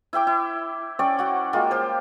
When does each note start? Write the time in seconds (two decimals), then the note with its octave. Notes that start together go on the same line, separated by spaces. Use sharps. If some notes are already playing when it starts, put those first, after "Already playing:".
0.13 E4 E5 G5 D6
0.27 E4
0.99 C#4 D5 G5 C#6
1.19 F#4 F#5 G5
1.53 G#3 A#3 F4 G4
1.71 G4 C5